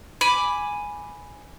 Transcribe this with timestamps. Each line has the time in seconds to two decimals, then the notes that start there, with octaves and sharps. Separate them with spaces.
0.21 G#5 B5 D6